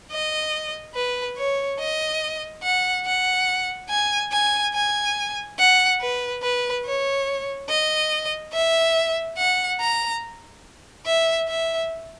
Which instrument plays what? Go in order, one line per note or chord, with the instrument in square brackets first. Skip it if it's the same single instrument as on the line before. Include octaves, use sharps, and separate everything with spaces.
[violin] D#5
B4
C#5
D#5
F#5
F#5
G#5
G#5
G#5
F#5
B4
B4
C#5
D#5
E5
F#5
A#5
E5
E5